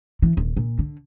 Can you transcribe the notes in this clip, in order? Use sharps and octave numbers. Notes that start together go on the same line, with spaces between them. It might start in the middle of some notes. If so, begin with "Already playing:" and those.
E3
D#1
A#2
D3